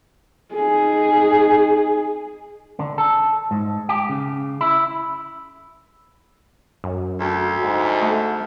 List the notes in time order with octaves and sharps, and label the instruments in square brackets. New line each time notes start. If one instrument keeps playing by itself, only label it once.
[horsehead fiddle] D#4 G#4
[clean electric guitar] D3
A4
G#2
G4
C#3
E4
[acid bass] F#2
[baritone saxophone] D2
[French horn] G#2
[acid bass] A3